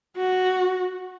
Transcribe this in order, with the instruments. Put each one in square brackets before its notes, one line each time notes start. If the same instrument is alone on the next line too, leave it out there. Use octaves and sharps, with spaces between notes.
[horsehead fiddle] F#4